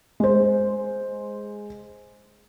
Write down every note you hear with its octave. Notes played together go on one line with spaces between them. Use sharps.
G#3 C5